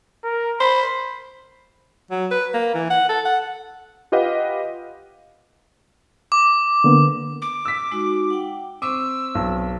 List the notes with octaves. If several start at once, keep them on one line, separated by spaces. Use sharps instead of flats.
A#4
C5 B5
F#3
B4
A#3
E3
F#5
A4
F#5
F4 G4 B4 D#5 F5 F#5
D6
D3 A#3 B3
D6
E6 B6
G#3 D#4 F#4
F#5 G5
C4 C5 C#6 D6 E6
B1